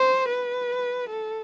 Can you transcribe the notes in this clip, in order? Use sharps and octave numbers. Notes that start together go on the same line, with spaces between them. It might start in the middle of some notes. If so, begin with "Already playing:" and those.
Already playing: C5
B4
A4